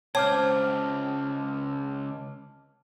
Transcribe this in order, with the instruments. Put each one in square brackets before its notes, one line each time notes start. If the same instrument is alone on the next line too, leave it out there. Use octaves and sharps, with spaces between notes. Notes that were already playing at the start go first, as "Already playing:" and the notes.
[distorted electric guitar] C#2 G5 [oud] C4 [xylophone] C#5 [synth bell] A5 D6 F6